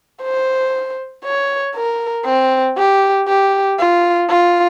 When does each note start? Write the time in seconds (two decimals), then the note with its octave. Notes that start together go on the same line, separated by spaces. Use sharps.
0.22 C5
1.24 C#5
1.75 A#4
2.25 C4
2.77 G4
3.28 G4
3.79 F4
4.29 F4